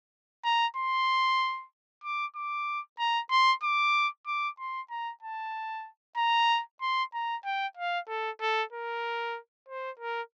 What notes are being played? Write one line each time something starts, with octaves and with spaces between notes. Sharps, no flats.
A#5
C6
D6
D6
A#5
C6
D6
D6
C6
A#5
A5
A#5
C6
A#5
G5
F5
A4
A4
A#4
C5
A#4